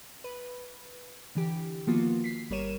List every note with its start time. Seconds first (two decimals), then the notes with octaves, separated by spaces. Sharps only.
0.24 B4
1.35 D3 E3 G4
1.87 D#3 F3 A#3 B3 F4 F#4
2.24 B6 C7
2.50 G1 G3 A#4 C#5 D#7 E7